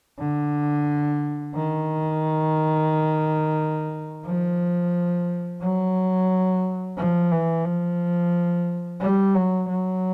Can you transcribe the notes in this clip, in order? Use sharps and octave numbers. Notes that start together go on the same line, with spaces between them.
D3
D#3
F3
F#3
F3
E3
F3
G3
F#3
F#3